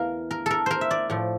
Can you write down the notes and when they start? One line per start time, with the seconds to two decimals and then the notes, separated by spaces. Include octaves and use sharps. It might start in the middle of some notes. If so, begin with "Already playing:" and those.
Already playing: E2 E3 A#4 F5
0.31 A#4
0.46 A4 A#4
0.66 A#4 C5
0.81 E5
0.91 D5
1.10 A2 F3